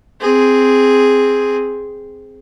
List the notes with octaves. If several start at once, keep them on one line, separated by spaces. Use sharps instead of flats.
C4 G#4